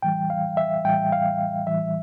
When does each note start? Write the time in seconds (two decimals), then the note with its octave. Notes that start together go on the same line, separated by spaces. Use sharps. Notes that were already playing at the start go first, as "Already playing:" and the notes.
0.02 A2 E3 G3 G5
0.30 F5
0.57 E5
0.85 A2 E3 G3 G5
1.12 F5
1.67 A2 E3 G3 E5